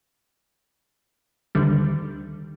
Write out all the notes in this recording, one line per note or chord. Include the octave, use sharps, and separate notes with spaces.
D2 D3 D#3 G3